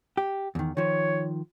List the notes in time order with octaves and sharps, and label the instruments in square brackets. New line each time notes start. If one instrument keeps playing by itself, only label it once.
[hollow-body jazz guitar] G4
E2 D#3
[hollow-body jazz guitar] D#3 F3 [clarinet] C#5